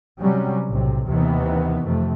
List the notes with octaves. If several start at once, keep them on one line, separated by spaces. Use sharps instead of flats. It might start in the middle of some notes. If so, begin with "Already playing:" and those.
C3 F#3 G3 C#4
B1 A2 C3
D#2 C3 D#3 E3 B3
F2 C3 A3